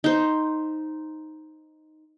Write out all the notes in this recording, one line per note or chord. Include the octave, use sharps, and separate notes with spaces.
D#4 C5